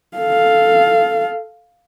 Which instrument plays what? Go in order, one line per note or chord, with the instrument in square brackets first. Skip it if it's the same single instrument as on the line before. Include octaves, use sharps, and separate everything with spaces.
[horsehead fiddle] A4 F5